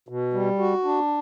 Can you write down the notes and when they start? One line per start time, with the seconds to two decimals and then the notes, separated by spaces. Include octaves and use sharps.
0.09 B2
0.33 G3
0.59 F#4
0.84 D4